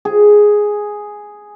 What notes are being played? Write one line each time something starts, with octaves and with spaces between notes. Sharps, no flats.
G#4